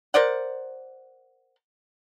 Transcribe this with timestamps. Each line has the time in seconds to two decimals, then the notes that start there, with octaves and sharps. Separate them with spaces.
0.14 A#4 C5 D5 F#5